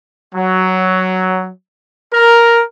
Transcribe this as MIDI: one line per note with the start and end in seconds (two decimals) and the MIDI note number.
0.34 1.49 54
2.13 2.62 70